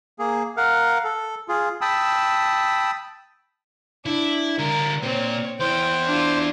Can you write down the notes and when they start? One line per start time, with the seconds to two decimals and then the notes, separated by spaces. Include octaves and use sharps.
0.19 A#3 G#4
0.57 A#4 F5 F#5
1.04 A4
1.48 F4 G#4
1.81 G5 A5 B5 D#6 E6
4.06 D4 E4
4.59 D3 F4 A#4
5.03 A#2 C4 C#5
5.60 E2 E4 C5 G5
6.06 D4 F4